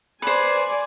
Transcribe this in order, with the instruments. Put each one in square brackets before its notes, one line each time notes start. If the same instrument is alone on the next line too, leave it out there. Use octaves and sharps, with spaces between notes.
[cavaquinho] B4 C5 [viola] D5 G#5